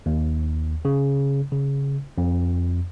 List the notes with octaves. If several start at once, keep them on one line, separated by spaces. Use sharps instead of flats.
D#2
C#3
C#3
F2